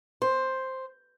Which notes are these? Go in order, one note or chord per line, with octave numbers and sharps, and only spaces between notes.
C5